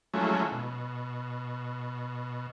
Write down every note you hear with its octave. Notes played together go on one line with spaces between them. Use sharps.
F3 F#3 G#3 A3 C#4 E4
B2